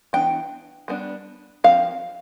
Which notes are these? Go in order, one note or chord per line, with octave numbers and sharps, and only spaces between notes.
E3 B3 D4 G5
G3 B3 D4
F3 C4 F5